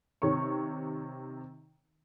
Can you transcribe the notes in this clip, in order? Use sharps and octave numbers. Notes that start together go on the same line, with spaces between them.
C3 D#3 C#5 C#6